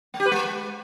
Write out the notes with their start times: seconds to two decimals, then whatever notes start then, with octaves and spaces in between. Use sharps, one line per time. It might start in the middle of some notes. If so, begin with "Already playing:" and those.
0.14 A3
0.20 G4
0.26 B4
0.31 G#3